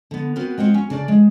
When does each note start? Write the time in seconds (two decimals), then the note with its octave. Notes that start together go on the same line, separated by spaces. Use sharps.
0.11 D3 B3
0.36 B3 C4 F#4 A#4 B4
0.58 G#3 C4 F4 F#5
0.74 C#4
0.90 C#3 D4 D5
1.08 G#3